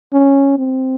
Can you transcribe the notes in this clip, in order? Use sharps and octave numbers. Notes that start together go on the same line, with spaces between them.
C#4
C4